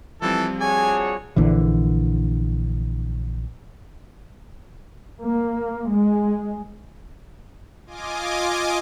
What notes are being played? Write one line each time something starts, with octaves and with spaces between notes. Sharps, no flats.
E3 F3 G3 C4 A4
D4 F#4 G#4 C#5 G#5
A#1 D3 E3
A#3
G#3
F4 D#5 G#5 D6